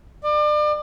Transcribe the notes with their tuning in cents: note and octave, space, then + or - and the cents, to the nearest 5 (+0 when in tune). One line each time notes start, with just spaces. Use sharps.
D5 +35